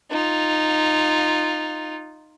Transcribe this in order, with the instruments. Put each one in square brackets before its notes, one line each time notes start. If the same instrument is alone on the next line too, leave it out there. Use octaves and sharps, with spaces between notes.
[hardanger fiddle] D#4 F4